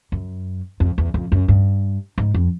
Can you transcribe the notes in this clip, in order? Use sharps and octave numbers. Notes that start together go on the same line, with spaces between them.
F#2
F2
E2
F2
F#2
G2
G#2
F2